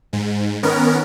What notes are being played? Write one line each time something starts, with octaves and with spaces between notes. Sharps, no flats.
G#2
D#3 B3 C#4 A#4